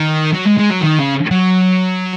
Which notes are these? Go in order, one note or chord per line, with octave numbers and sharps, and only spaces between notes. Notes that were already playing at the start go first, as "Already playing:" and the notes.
Already playing: D#3
F#3
G#3
G#3
F#3
D#3
C#3
F#3